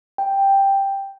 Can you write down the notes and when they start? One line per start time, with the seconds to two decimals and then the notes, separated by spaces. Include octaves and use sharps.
0.18 G5